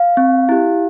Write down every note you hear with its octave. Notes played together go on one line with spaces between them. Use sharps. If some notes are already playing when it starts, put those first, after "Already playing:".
Already playing: F5
C4
E4 G4